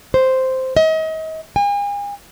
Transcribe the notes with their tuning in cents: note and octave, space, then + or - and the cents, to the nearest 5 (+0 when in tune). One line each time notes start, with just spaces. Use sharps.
C5 -5
D#5 +35
G#5 -40